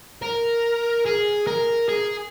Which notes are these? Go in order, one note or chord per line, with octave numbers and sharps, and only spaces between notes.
A#4
G#4
A#4
G#4